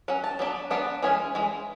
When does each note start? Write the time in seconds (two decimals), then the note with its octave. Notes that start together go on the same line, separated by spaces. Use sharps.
0.08 F#3 C#4 F#5
0.24 A5
0.39 F#3 B3 D4
0.70 F#3 B3 D4 F#5
1.03 E3 G#3 C#4
1.35 E3 G#3